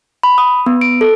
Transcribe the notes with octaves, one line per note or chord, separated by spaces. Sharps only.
B5
D#6
B3
D7
A4